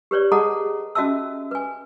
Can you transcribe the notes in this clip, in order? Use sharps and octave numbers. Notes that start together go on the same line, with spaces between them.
G4 B4 C#5 D5
G#4 A4 D#5 F#5 A5 A#5
C#4 F#4 D#5 E5 A5 E6
B4 G#5